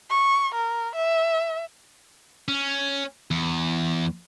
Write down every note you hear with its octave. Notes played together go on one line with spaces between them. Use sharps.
C#6
A#4
E5
C#4
E2